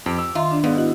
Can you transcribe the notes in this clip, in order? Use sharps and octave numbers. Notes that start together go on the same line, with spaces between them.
F2 G4
E6
D#3 F4 E5 A#5
D4 D5
G#2 B3 G#4 D5 F5
E4 F#4 D#5